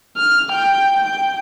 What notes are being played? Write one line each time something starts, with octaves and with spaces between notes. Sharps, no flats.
F6
G5
G5